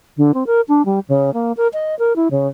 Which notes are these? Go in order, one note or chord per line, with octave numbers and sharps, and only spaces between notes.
D3
C4
A#4
D4
G3
C#3
A#3
A#4
D#5
A#4
E4
C#3